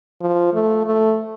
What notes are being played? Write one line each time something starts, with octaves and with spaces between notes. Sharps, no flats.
F3
A3
A3